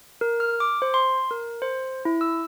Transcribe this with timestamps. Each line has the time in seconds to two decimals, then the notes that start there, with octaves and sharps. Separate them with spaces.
0.21 A#4
0.40 F6
0.60 D6
0.82 C5
0.94 C6
1.31 A#4
1.62 C5
2.05 E4
2.21 E6